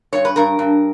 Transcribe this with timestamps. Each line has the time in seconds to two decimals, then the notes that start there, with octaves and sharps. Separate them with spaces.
0.13 G2 C#5
0.25 B4
0.36 G2 A#4
0.59 G2